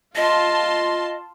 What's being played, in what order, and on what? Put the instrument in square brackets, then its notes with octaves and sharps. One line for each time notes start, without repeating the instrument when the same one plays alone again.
[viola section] F4 A5 C6 [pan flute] D#5